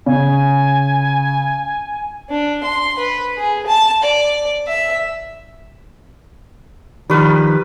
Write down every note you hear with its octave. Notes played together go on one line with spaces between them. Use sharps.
C#3 G#5
D4
C6
B4
G#4
A5
D5
E5
D#3 F3 G3 B4